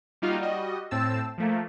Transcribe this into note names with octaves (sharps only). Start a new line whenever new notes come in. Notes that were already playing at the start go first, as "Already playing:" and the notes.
G3 A#3 D#4 F4 F#4 F5
G3 F#4 D#5
A2 C4 A5 E6
F3 A3 A#3